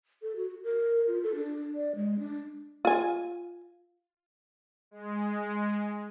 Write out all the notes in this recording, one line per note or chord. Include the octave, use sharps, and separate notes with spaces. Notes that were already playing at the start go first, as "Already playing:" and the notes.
A4
F#4
A#4
F4
A4
D4
D5
G#3
D4
F4 G#5
G#3